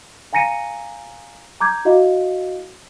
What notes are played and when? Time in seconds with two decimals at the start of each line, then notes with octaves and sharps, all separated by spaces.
0.33 F5 G#5 A#5 A#6 C#7 D#7
1.60 A#5 D6 G6 G#6
1.85 E4 F#4 D#5 F5